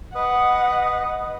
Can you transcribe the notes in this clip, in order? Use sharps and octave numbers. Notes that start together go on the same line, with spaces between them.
B4 D#5 F#5 D#6